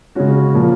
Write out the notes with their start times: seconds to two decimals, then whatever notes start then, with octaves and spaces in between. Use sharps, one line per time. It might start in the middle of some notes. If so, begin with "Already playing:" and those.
0.15 C#3 G#3 C#4 F#4
0.54 A#2 F3 A#3 F4